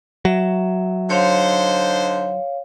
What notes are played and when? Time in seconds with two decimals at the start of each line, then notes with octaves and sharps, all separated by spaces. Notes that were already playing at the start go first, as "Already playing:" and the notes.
0.25 F#3 E5
1.10 D3 D#4 C5 C#5 F5